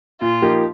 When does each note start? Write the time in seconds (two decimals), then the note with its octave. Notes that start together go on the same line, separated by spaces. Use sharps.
0.21 A#2 F4
0.42 F3 A#3 D#4 G4